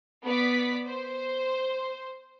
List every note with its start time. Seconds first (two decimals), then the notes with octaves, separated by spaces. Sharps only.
0.25 B3 D5 B6
0.87 C5